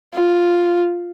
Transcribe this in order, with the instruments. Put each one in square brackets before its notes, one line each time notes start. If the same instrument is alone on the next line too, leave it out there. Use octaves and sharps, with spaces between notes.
[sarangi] F4